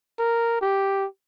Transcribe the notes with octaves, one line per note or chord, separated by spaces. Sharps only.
A#4
G4